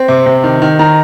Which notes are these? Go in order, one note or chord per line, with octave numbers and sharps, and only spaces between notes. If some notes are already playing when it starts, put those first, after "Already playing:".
Already playing: C4
C3
C3
D#3
D#3
D#3 A#5